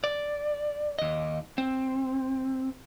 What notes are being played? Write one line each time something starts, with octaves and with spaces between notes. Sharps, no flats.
D5
D#2 D#5
C4